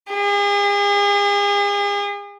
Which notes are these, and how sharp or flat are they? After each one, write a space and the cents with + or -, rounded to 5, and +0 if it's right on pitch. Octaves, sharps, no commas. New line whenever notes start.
G#4 -40